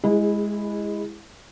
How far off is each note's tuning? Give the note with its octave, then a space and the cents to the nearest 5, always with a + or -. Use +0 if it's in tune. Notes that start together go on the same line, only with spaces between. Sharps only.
G#3 +0 E4 +0 G#4 -30